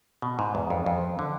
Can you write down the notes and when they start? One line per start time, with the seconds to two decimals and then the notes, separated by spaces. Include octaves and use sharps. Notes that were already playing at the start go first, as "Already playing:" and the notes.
0.22 B2
0.39 G#2
0.55 E2
0.70 F2
0.86 F2
1.19 D3